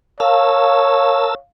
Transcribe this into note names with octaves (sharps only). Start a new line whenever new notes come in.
A#4 C#5 F5 A5 E6